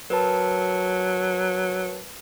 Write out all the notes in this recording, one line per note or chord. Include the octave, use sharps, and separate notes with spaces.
F#3 A#4 B4 A5